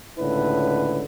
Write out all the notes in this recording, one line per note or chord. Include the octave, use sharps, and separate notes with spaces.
C#2 A2 D3 E4 B4